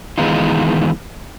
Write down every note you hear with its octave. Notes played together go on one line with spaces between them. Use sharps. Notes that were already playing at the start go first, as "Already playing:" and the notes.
D#3 E3 G#3 B3 D#4 F4